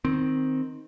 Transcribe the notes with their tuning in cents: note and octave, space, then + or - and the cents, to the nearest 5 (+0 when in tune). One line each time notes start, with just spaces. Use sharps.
D#3 +0 C4 +0